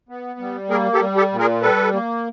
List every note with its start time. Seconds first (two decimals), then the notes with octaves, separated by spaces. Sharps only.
0.09 B3
0.40 G3
0.70 A#3 G#4 A#4
0.94 G4 A4
1.01 G3
1.16 G4 A4
1.32 A#2
1.39 G#4 A#4
1.62 G3 A4 B4
1.93 A#3